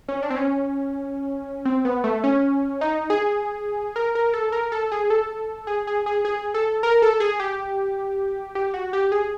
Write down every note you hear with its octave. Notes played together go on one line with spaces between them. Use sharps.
C#4
D4
C4
C#4
C4
B3
A3
C#4
D#4
G#4
A#4
A#4
A4
A#4
A4
G#4
A4
G#4
G#4
G#4
G#4
A4
A#4
A4
G#4
G4
G4
F#4
G4
G#4